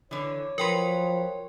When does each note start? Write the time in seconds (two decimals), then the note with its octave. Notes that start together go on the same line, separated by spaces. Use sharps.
0.11 D3 E3 C#5
0.58 F3 F#3 A#4 B4 G5 C6